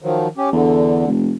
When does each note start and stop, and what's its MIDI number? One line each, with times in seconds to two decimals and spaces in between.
0.02 0.28 51
0.02 0.28 53
0.02 0.28 54
0.37 0.50 61
0.37 0.50 67
0.52 1.06 40
0.52 1.09 50
1.08 1.34 29